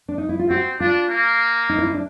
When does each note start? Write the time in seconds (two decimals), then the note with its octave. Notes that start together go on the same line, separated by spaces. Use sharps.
0.08 D4
0.18 D#4
0.29 E4
0.39 F4
0.50 C4 F#4
0.80 D4 F4
1.09 A#3
1.69 D#4
1.78 E4
1.87 D#4
1.94 D4